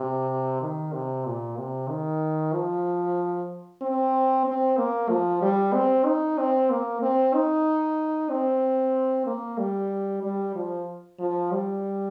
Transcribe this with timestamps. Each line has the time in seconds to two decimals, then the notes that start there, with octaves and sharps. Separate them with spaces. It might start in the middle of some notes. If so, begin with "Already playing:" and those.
Already playing: C3
0.62 D#3
0.93 C3
1.26 A#2
1.57 C3
1.89 D#3
2.53 F3
3.82 C4
4.47 C4
4.77 A#3
5.10 F3
5.42 G3
5.74 C4
6.06 D#4
6.39 C4
6.71 A#3
7.02 C4
7.34 D#4
8.30 C4
9.27 A#3
9.59 G3
10.23 G3
10.55 F3
11.19 F3
11.52 G3